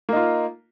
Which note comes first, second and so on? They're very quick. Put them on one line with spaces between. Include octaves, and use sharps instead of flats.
A#3 D#4 F4